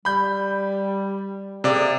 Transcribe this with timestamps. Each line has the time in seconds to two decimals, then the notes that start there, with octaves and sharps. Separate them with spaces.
0.05 G3 B5 G6
1.64 C3 A#3 G#4 A4 D5